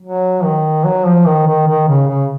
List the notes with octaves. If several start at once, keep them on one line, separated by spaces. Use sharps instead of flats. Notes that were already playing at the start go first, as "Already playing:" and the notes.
F#3
D#3
F#3
F3
D#3
D#3
D#3
C#3
C#3